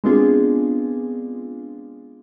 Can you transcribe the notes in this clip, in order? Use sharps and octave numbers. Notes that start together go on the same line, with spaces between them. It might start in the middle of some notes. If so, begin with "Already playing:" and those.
G#3 B3 C4 D4 F4 G#4